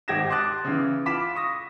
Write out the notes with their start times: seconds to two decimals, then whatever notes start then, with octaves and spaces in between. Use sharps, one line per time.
0.08 G#1 G4 G5 G#6 A#6 E7
0.30 A5 C6 D6 D#6 F#6 A6
0.64 C#3 E3
1.06 F4 B5 D6 B6 E7
1.35 C#6 D#6 A#6